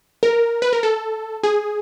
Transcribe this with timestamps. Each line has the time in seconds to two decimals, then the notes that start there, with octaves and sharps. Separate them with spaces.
0.23 A#4
0.62 B4
0.73 A#4
0.83 A4
1.43 G#4